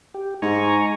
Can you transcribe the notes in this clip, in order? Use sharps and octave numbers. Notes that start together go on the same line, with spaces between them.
G4
G#2 G#5 A#5 C#6